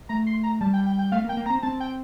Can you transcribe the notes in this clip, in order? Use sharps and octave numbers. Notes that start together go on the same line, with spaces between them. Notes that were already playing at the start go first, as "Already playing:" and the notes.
A3 A#5
C6
A#5
G3 A5
G5
G5
G5
A3 F5
A#3
G5
A#3
A#5
C4
C4 A5
G5